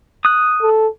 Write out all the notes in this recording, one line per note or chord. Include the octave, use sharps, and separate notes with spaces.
D#6 F#6
A4